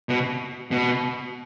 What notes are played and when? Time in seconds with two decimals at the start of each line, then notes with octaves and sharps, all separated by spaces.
0.09 B2
0.71 B2